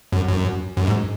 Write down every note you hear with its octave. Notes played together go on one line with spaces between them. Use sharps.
F#2
F#2
F#2
G#2